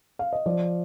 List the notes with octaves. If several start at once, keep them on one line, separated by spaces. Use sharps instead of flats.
F5
D#5
F3 D5